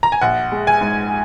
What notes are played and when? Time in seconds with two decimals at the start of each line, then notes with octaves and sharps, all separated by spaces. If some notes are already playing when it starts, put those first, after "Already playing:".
0.03 A#5
0.12 G#5
0.22 A#1 F#5
0.52 G#3
0.67 G#5
0.81 G#2